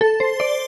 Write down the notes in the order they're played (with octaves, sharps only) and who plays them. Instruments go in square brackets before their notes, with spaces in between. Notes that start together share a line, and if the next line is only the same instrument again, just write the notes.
[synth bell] A4
C5
D5